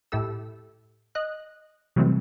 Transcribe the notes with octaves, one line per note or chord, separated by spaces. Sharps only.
A2 E4 G4 A4 E6
D#5 F#6
C3 E3 F#3 G3 A3 C4